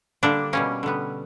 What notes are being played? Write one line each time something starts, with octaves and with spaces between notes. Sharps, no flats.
D3 G3 A#3 D4
B2 G3 A#3 C#4
D3 G3 B3